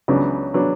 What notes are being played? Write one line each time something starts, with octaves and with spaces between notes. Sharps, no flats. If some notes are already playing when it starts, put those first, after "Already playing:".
C#2 C#3 F#3 B3 D4
C#3 F#3 B3 D4